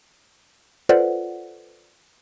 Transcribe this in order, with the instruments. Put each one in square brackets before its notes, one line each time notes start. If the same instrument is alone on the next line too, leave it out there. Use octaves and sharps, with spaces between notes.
[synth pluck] F4 A4 B4 C5 D5 F#5